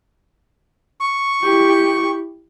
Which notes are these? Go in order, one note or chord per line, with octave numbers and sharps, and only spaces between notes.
C#6
E4 G4